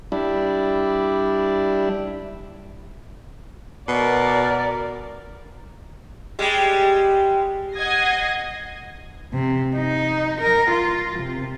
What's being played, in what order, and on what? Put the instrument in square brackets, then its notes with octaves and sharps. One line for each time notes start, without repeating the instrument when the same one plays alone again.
[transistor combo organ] G3 D4 E4
[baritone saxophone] B2 [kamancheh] A#4 D5
[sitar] G3 G#3
[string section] D#5 F#5 D#6 G#6 A#6 C7
[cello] C3
D#4
A#4
F4
C3